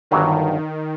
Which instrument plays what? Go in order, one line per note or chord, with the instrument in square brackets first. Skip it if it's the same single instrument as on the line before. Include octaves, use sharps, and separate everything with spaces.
[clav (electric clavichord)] G1 G2 F#3 [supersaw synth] D#3